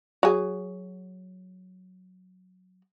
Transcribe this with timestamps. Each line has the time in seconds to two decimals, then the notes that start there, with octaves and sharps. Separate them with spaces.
0.23 F#3 G#4